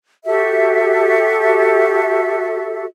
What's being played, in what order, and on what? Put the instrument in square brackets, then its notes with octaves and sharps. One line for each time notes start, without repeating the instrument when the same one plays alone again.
[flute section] F#4 G4 A4 E5